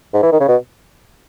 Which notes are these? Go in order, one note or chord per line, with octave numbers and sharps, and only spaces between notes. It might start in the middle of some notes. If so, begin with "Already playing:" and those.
G#2
E3
D#3
C#3
B2